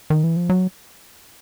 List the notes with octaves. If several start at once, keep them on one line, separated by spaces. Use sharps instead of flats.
D#3
E3
F3
F#3